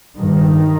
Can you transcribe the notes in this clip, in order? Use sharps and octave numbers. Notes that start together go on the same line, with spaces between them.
G2 D#3